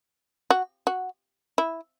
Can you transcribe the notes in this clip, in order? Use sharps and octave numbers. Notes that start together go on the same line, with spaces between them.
F#4
F#4
E4